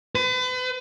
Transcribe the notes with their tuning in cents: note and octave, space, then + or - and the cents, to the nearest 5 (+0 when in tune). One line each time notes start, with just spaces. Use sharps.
B4 +40